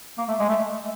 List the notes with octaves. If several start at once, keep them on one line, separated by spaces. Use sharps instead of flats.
A#3
A3
G#3
A3